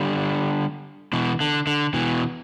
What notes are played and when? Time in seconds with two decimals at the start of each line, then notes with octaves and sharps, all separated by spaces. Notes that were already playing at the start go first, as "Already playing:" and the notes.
Already playing: D3 G3
1.13 B2 E3
1.40 D3
1.67 D3
1.94 B2 E3